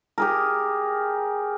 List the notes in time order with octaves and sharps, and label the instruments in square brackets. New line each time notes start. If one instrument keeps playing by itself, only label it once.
[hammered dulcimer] G4 G#4 A#4